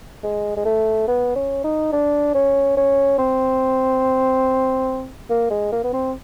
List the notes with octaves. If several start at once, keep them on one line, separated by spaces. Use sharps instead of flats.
G#3
G#3
A3
B3
C#4
D#4
D4
C#4
C#4
C4
A#3
G#3
A#3
B3
C4